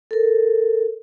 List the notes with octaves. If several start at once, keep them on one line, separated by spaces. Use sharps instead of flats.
A4 A#4